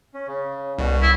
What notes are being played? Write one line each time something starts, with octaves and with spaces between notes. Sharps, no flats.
C#4
C#3
C2 B2 G3 F#4
E4 D#5